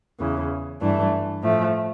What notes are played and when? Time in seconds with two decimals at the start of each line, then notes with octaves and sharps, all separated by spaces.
0.19 E2 C#3 E3
0.81 G2 E3 A3 D4
1.41 A2 F3 A3